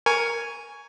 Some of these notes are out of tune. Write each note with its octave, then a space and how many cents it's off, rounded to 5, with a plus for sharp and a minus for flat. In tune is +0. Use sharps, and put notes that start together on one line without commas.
A#4 +0 G#5 +0 C#6 +15